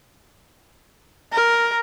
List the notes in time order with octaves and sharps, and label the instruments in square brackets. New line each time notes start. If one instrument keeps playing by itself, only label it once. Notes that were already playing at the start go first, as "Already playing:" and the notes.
[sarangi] A#4